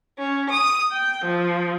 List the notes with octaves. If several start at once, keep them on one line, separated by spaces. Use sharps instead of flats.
C#4
D#6
G5
F3